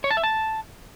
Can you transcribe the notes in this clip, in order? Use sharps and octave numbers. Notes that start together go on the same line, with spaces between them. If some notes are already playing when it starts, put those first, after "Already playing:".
C#5
A5
E5
A5